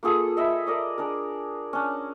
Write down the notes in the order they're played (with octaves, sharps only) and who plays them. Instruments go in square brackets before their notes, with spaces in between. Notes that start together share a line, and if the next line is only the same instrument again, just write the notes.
[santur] A#3 F4 G#4 A4
D#5 E5 B5
A#4 D5 D#5
D4 G#4 A#4
C#4 D4